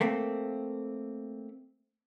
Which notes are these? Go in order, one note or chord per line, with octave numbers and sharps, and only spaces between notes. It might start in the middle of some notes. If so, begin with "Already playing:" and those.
A3 A#3 C4